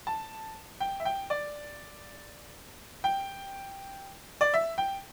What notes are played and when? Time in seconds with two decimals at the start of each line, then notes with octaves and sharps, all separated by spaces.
0.07 A5
0.80 G5
1.00 E5
1.05 G5
1.30 D5
3.04 G5
4.41 D5
4.54 E5
4.78 G5